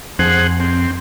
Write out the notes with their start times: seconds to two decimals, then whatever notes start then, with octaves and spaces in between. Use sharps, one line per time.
0.19 F2 G#4 C5 F#5
0.60 C4